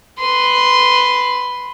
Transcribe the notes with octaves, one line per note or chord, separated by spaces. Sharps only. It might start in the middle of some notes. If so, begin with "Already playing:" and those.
B4 C6